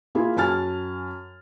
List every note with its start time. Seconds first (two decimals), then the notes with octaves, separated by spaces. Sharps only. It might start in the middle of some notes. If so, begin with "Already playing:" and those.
0.15 A#3 E4 F4 G#4
0.36 F#2 G#5 A5 F6 A6